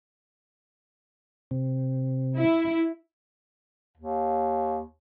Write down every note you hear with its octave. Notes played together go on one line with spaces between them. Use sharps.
C3
E4
D#2